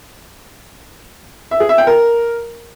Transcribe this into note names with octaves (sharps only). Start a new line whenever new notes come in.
E5
G#4
E5
G5
A#4